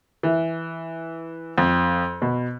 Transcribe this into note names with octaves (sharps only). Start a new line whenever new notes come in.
E3
F2
B2